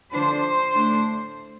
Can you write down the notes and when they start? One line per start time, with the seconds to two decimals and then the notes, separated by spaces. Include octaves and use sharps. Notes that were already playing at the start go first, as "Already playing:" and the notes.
0.12 D3 F3 D4 C5
0.72 A2 A3 D4